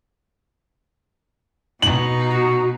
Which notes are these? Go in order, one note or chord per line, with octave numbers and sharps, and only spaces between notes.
B2 D#4 F#7
F#4